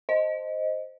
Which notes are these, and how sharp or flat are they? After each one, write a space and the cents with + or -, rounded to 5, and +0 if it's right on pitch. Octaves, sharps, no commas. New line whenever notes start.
C5 +0 D#5 +0